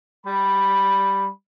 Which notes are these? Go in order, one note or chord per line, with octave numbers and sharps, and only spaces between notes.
G3 B5